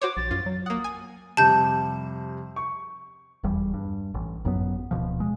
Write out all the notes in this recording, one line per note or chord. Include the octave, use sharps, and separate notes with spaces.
F#4 C5 C#5 D6
A#1 A6
F#2 F4
F#3
A#3 F#5 D#6
G#5
F2 C3 G3 A5 G6
C#6
F1 E2 G3
G2
A1
G#1 F#2 F#3 B3
D1 A#1 B2 F3
G#3